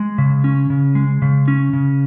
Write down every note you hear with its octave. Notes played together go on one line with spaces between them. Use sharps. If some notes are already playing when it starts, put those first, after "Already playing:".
Already playing: G#3
C#3
C#4
C#3
G#3
C#3
C#4
C#3